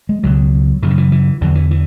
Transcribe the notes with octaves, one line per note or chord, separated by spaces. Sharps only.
G#3
C#2 B2 F#3
F#2 C#3 E3
D3
E3
E3
E2 D3 F#3
E3
E3